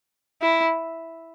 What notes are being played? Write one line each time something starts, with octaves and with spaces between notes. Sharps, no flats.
E4